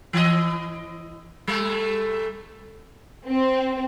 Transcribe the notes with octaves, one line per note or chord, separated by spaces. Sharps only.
E3 D#5
G3 A3
C4